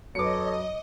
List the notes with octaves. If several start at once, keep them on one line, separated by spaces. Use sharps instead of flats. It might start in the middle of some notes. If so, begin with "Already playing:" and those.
F#2 A4 B4 C#5 D#5 D6 C#7